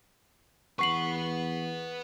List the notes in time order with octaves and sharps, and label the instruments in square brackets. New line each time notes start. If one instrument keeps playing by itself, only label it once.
[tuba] E2 [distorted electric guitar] B4 F#5 [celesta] C#6 C7 F#7